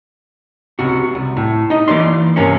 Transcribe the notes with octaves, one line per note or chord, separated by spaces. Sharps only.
C#2 C3 F#4
C2
A2
D#4 D#5
E3 A#3 D5 C6
G2 C3 A#3 C4 C#4